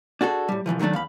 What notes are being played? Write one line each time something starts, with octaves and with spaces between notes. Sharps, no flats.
D4 F#4 G#4 A4
A2 G3
C2 G#2 E3 F3
D3 D#3 F#3 A3 D4
E2 F5 B5